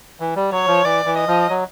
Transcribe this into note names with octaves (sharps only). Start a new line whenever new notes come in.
E3
G3
F#3 C#5
F3
E3 D5
E3
D#5
F3
F#3